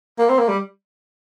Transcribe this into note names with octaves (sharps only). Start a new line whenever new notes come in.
A#3
C4
A#3
G3